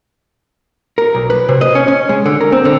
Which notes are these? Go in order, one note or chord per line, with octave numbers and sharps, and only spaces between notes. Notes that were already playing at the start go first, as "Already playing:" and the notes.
A#4
B1
B4
C3
D#5
C#4
C#4
G#3
D3
A#4
C4
D3